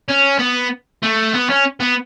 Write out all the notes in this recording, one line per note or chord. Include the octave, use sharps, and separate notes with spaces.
C#4
B3
A3
B3
C#4
B3